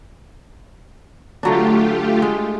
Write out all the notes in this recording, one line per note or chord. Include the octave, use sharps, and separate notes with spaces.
D3 F#3 A3 D4 F4 G4
G#3